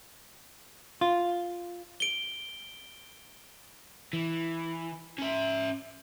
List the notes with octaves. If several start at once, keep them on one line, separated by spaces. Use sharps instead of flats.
F4
D7 G7
E3
C#4 E5